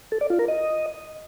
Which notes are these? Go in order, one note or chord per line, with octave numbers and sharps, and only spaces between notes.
A4
D5
F4
A#4
D#5